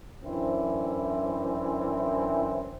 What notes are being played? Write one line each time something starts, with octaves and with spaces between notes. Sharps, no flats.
F#2 D3 E3 C4 E4